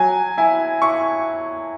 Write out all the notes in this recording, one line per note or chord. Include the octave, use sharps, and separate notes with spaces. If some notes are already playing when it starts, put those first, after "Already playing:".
Already playing: F#3 G#5
E4 G#5
E4 C#6